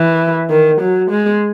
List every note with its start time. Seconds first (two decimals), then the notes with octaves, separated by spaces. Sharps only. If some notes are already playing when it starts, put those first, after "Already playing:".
Already playing: E3
0.50 D#3
0.80 F#3
1.10 G#3